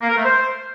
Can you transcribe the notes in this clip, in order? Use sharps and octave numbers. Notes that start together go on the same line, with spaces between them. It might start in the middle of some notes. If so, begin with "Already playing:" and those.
A#3
A#4
A3
C5